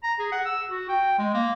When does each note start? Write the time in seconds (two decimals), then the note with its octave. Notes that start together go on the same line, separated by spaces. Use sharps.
0.03 A#5
0.19 G#4
0.32 F#5
0.46 E6
0.69 F#4
0.89 G5
1.18 G#3
1.34 A#3